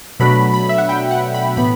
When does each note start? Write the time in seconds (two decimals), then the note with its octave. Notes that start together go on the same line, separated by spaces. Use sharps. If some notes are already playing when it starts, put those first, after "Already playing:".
0.20 B2 F#3 A3 D4 B5
0.54 B5
0.69 E5
0.78 F#5
0.89 G5
1.11 F#5
1.35 B5
1.57 A2 E3 B3 B5